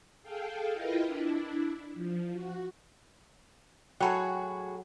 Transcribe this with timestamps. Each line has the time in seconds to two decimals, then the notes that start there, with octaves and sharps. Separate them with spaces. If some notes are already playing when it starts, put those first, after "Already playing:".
0.23 G#4 A4 F5 G5
0.74 E4 F4 A#4 B4 D#5 G5
1.03 D4 E4
1.94 F3
2.33 F#4
4.00 A2 F#3 F#4 G#4 G5 A5 B5